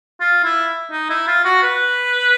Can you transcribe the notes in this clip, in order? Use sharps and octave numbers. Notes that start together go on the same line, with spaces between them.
F4
E4
D#4
E4
F4
F#4
B4